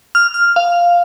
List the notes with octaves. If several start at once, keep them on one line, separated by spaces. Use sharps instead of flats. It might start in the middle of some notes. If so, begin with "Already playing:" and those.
F6
F6
F5